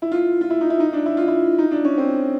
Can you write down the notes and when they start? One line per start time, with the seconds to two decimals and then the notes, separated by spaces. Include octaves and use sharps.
0.02 E4
0.12 F4
0.41 F4
0.50 E4
0.61 D#4
0.70 E4
0.80 D#4
0.93 D4
1.06 E4
1.17 F4
1.28 E4
1.58 D#4
1.71 D4
1.85 C#4
1.98 C4